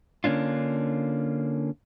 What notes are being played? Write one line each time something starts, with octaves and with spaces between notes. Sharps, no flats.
D3 A#3 C#4 D4 F4